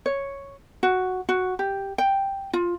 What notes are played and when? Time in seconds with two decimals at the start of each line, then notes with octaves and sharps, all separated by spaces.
0.06 C#5
0.83 F#4
1.29 F#4
1.59 G4
1.98 G5
2.53 F4